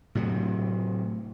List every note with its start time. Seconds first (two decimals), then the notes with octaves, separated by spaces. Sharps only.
0.15 A2 C3 F#3